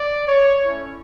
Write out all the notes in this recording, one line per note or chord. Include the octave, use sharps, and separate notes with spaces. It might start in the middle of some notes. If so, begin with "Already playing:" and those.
Already playing: D5
C#5
A3 C#4 E4